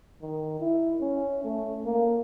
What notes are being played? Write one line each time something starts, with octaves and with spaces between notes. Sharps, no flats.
D#3
E4
C#4
A3
A#3